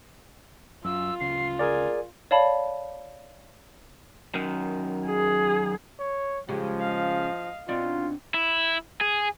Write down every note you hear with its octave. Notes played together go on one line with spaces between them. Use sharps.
F#2 F4 E6
D1 C#3 C7
G#4 A#4 D5 G#5
C#5 D5 F5 A5 B5
F#2 D#3
G#4
C#5
C#3 F3 G#3 G4
D#5 F5
B2 C4 D4 D#4 F4
E4
G#4